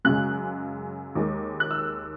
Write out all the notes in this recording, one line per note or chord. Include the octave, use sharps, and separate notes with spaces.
F#2 C#3 G#3 F#6
D#2 D#3 G#3
F#6
E6